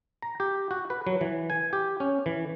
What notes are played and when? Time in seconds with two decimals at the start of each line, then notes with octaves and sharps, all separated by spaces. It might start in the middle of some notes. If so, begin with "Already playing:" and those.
0.22 A#5
0.40 G4
0.71 F#4
0.90 B4
1.07 F#3
1.21 E3
1.50 G#5
1.73 G4
2.00 C#4
2.26 E3